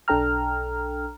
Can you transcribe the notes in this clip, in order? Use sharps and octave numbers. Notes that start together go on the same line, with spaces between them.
B1 D4 A4 G5 A#5 F6